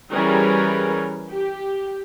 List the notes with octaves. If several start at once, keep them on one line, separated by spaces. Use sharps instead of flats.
E3 G3 C#4 G#4 A#4 B4
G4